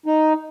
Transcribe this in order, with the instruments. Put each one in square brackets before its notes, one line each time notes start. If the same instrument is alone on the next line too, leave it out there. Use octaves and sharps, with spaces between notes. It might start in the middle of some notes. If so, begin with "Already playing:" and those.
[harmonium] D#4